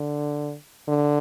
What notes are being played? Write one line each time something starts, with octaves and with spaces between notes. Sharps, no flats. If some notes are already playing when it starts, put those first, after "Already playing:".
Already playing: D3
D3